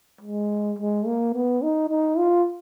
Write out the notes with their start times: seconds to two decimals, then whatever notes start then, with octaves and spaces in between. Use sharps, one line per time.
0.21 G#3
0.79 G#3
1.07 A#3
1.34 B3
1.62 D#4
1.90 D#4
2.18 F4